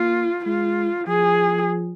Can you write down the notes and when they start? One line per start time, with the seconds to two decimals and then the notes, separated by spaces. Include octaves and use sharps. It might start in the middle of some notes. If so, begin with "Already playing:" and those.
Already playing: A#3 F4
0.46 G#3 F4
1.07 F3 G#4